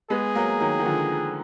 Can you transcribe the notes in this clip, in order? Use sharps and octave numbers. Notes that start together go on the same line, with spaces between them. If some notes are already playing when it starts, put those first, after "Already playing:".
G#3 B3 G#4
F#3 A#3
D#3 F#3
D#3
D3 F3